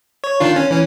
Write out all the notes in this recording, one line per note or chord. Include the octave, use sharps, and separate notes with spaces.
C#5
D#3 D4 F4
C#4
E3 C#4